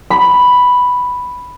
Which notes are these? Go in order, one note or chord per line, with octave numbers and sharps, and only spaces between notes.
B5